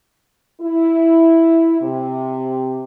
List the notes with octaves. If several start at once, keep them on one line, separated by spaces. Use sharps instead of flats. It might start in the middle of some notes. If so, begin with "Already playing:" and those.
E4
C3